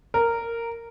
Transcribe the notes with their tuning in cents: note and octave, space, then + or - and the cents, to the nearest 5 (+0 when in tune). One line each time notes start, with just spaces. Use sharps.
A#4 -10